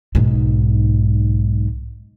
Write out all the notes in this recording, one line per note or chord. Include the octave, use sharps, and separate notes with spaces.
B1 G#2